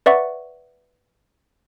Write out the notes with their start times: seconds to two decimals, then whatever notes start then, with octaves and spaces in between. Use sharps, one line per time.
0.06 B4 D5 E5 F#5 C#6